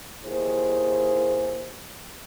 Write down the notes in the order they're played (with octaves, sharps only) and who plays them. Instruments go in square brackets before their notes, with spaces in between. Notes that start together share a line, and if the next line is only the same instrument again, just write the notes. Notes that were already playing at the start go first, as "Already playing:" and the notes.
[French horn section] D#2 E4 G#4 C5